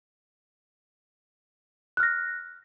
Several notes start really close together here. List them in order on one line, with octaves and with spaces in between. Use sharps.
F#6 F6 A#6